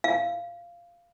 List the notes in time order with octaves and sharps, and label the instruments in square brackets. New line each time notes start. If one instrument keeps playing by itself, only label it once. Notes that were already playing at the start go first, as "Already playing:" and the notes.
[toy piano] F5